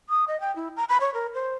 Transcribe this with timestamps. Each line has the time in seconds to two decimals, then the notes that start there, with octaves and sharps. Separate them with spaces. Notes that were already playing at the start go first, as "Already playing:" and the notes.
0.09 D#6
0.28 D#5
0.41 G5
0.56 E4
0.77 A#5
0.89 B5
1.01 C#5
1.14 A#4
1.34 C5